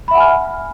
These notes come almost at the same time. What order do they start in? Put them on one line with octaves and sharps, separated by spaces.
B5 E5 F#5 G#5 F6